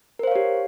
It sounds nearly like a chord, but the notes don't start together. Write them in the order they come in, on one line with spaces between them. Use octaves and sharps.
A#4 C5 F5 C#5 G4